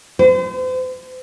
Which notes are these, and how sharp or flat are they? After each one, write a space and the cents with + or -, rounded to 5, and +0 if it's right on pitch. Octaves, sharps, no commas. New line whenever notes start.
C5 -40